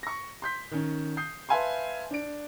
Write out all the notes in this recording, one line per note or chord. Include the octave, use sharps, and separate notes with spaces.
C#6 A#6
C6 G6 B6
D#3 C#4
D#6 G6 C7
B4 E5 F5 G#5 A5 C6
D4 D7